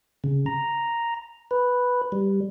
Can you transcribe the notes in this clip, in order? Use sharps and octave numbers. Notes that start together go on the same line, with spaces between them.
C#3
A#5
B4
G3